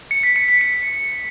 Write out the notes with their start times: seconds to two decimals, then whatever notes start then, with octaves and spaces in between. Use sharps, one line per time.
0.11 C#7
0.23 B6
0.36 C#7
0.48 B6
0.61 C#7